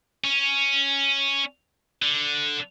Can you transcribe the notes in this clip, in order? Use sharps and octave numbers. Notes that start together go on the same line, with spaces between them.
C#4
D3